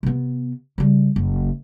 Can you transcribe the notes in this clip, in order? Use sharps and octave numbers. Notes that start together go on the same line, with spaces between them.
C3 B3
C#3 G3
F#1